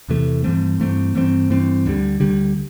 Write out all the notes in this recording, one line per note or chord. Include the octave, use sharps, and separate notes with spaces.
E2 C3 E3 A3
G2 E3 A3 C4
G2 E3 A3 C4
G2 E3 A3 C4
G2 E3 A3 C4
D2 D3 G3
D2 D3 G3